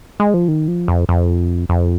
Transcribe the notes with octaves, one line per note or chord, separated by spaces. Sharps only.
G#3
F3
D#3
F3
F2
F2
F2